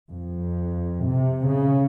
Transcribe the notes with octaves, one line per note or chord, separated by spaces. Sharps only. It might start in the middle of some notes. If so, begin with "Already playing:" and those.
F2
C3
C#3